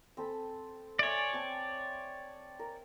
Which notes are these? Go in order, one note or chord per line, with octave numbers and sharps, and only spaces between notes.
C4 A4 B5
C#5 D5 E5 G#5 C6
C4 G5 A5
A#4